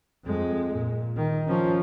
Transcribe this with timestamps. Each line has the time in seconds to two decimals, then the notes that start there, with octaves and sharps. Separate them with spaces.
0.25 F2 G#3
0.76 A#2
1.16 D#3
1.47 F3 C#4